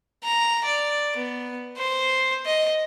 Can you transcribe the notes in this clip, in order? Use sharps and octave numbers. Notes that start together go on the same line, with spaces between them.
A#5
D5
B3
C5
D#5